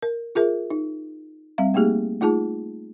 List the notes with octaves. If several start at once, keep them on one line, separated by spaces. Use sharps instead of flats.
A#4
F4 G#4 A#4 E5
D#4
G3 C4 E5 F5
A3 A#3 D#4 G4 G#4
A3 D#4 F4 G#4 A5